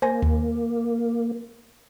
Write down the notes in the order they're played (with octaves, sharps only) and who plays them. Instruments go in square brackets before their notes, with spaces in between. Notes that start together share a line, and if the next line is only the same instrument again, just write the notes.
[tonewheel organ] A#3 [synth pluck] C5 G#5 A#6
[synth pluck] D#2